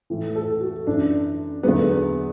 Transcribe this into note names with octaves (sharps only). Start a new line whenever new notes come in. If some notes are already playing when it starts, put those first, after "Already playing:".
A2 E3
A4
F#4
F#2 E3 D4
E2 D3 F#3 B3